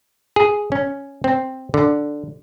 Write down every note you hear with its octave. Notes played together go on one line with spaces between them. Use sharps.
G#4
C#4
C4
D3